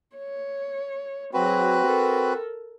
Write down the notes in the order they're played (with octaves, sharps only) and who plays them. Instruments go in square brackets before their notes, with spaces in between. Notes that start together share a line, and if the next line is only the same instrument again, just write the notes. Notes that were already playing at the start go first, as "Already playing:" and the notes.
[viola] C#5
[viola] F#3 G#4 [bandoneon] C4 F#4 B4
[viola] A4 A#4